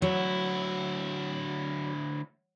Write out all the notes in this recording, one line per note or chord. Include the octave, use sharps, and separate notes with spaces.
D2 F#3 E4